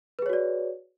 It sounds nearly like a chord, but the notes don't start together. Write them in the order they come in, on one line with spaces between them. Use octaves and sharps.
B4 G#4 C#5 F#4 D5